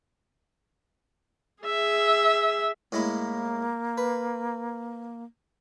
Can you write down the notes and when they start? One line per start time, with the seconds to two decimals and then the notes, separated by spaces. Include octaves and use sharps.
1.63 G#4 E5
2.92 A2 G#3 A#3 E4
3.98 B4